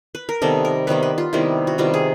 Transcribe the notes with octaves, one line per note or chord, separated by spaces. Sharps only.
B4
A#4
C3 D#3 G3 B3 A4
A#4
C3 D#3 G3 B3 B4
B4
F4
C3 D#3 G3 B3 E4
F#4
C3 D#3 G3 B3 F4
G#4